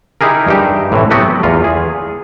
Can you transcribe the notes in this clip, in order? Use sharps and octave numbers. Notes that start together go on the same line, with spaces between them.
D#4 E4 G4 G#4 A#4
G2 D#4 G4 E5
A2 C3 E3
F#3 B3 F#4 G4 A4 B4
E2 F4
G#4